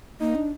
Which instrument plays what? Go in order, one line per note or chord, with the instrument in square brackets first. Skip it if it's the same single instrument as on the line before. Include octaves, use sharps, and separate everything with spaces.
[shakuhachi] A#3 [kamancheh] D#4
[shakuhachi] D4